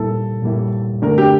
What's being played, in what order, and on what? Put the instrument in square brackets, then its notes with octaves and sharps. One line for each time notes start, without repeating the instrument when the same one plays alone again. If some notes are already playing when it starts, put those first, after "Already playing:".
Already playing: [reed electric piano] A#2 G3 A#3 E4 [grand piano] A4
[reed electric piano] A#2 G3 A#3 E4
[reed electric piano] D3 A3 D4 [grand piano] A#4
[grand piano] G4